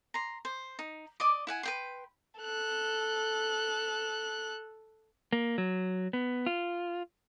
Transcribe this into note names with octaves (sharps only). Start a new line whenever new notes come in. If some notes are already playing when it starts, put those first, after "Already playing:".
A#5 C6
C5
D#4
D5 D#5 D6
E4 F#5 G#5
B4 G5 C6
A4 F#6
A#3
F#3
B3
F4